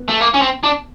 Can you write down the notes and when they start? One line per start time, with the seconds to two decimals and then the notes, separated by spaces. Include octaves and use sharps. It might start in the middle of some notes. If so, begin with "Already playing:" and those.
Already playing: B3
0.09 A3
0.21 A#3
0.34 C#4
0.42 C4
0.63 D4